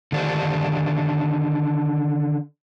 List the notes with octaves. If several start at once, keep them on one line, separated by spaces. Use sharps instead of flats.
D3 D#3 D4 F#4 G4 C5